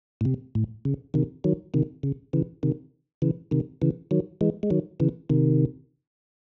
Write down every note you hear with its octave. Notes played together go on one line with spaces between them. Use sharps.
A2
C3
A2
C#3
C3 D#3
D#3 F#3
C3 D#3
C#3
C#3 E3
C3 D#3
C#3 E3
C3 D#3
C#3 E3
D#3 F#3
E3 G#3
G#3
D#3 F#3
C#3 E3
C3 D#3